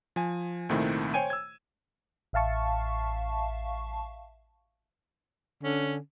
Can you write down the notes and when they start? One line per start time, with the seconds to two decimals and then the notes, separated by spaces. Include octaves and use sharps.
0.16 F3 G#5
0.69 C2 A#2 D#3 A3 C4 E4
1.14 C5 C#5 G5 G#5 D#7
1.30 E6 G#6
2.33 A1 E5 F5 A5 C#6
5.63 D3 C#4